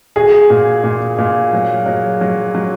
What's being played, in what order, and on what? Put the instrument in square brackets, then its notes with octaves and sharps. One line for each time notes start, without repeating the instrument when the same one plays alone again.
[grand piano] F#4 [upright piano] G#4
[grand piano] A#2
A#2
A#2
F#3
F#3
F#3
F#3